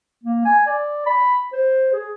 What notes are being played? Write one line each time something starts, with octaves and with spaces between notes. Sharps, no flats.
A#3
G#5
D5
B5
C5
G#4